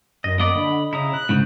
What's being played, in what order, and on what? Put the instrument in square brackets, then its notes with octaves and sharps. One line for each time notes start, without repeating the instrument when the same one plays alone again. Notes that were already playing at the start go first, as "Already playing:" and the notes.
[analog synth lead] F#2 [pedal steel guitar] D#5
[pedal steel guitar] A#3 B3 D5 [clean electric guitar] D#5
[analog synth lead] D3 [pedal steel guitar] B5
[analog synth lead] C#3 [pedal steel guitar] E4 A#5 D#6
[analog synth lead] F#6
[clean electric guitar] G#2 C#3 [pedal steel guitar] E4 C5